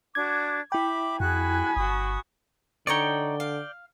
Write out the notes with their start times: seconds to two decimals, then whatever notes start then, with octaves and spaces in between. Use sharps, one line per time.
0.15 D4 F#4 D6 G#6
0.72 E4 E5 G5 B5 D6
1.20 F2 F#4 G#4 G#5 B5 F#6
1.77 G1 F#4 C#6 D#6
2.87 D3 D#4 C#5 D5 G5 C#6
3.40 F5